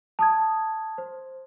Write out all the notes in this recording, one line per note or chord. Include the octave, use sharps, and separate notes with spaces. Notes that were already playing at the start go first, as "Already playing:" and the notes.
A5 D#6 G#6
C5